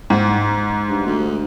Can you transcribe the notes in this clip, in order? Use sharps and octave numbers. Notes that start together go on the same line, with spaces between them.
G#2
G2
D2